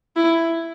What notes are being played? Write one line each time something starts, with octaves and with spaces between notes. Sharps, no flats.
E4